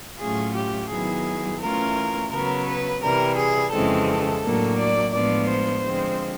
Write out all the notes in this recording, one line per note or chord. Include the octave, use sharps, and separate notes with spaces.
A2 F#3 A3 C#4 F4 G#4
G4
D#3 F#3 B3 E4 G#4
E3 A3 C#4 F4 A#4
C#3 F#3 B3 A#4
B4
C3 E3 G3 A#4
G#4
F2 C#3 E3 G#3 C4 A4
A2 F#3 A#3 D4
D5
A2 F3 G#3 B3 D4 D5
C5
D3 F3 G#3 C4